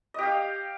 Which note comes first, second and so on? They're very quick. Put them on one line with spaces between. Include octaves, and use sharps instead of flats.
D#5 G4 F5